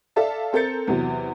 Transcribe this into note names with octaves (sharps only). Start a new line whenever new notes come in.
A4 D5 E5 F5 A5
C4 A4 A#4 G6 A6 C#7
E2 C3 F#3